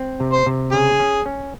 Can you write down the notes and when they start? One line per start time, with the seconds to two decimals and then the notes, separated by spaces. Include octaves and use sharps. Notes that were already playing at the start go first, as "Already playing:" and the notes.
Already playing: C4
0.20 C3
0.33 C5
0.46 C3
0.72 C#3 G#4
1.00 C#4
1.26 C#4